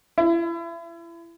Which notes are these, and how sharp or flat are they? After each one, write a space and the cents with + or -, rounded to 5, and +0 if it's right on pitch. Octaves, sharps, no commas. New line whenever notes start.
E4 +35